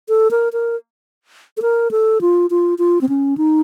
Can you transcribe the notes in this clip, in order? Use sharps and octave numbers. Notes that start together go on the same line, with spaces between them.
A4
A#4
A#4
A4
A#4
A4
F4
F4
F4
C4
C#4
D#4